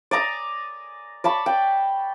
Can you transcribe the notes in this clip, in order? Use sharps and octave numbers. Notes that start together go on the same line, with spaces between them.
D5 G#5 A#5 D#6
D5 A5 B5 C#6
G5